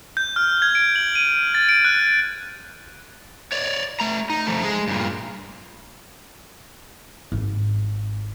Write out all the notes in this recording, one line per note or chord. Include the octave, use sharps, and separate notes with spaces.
G6
F6
G#6
D7
F#7
D#7
A6
D7
F#6
C#5 D5
A3 A#5
D#4
F3 A3
G#3 G#4
G2 A#2
G#1